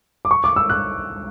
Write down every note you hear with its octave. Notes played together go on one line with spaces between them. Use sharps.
D6
C#6
D6
E6
F#6